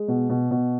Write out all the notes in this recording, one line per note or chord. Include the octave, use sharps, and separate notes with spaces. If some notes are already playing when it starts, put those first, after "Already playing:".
Already playing: G#3
B2
B2
B2